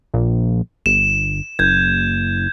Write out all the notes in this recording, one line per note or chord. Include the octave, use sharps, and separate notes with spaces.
A#1
G1 E7
F#1 G6 G#6